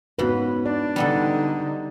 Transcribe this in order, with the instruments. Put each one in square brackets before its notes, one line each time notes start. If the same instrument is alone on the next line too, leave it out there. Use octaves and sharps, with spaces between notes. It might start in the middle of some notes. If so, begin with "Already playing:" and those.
[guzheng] G#2 C#3 B5 [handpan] B3 F#4 B4
[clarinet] D4 [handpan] D5
[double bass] D3 D#4 [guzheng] G3 B3 A4